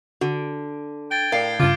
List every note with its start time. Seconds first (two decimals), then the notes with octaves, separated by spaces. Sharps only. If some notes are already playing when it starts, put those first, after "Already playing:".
0.21 D3 F#4
1.11 G5 G#6 A6 G7
1.32 A2 A#4 D5 F5 G6 C7 D7
1.60 G2 C#3 F4 D6